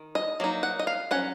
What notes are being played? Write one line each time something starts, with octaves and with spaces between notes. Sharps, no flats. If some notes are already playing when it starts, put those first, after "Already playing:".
Already playing: D#3
D#5
F#3 A#3 D#4
F#5
D#5
F5
F#3 C#4 F#5